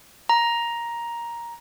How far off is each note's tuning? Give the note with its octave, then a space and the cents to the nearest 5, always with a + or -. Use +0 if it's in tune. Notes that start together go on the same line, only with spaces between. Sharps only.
A#5 +10